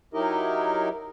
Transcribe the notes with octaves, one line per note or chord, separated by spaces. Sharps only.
F#3 D#4 E4 G4 A#4 D#5